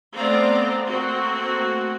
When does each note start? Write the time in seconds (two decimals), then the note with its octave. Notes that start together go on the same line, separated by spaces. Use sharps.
0.15 A3 B3 C4 D5 F5 A#5
0.86 A3 A#3 C4 F#4